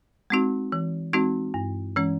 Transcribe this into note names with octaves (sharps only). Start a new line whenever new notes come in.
G#3 C4 D#4 F#4
E3
G#3 C4 D#4 F#4
G2
E3 G#3 C#4